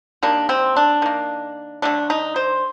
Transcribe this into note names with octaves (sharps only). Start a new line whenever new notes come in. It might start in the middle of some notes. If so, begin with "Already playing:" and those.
D#3 G3 A#3 D4
C4
D4
D#3 A#3
D3 A3 D4
D#4
C5